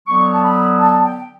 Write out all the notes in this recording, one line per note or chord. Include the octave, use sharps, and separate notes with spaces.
D3 F#3 B3 C#6
A5
B5
A5
G5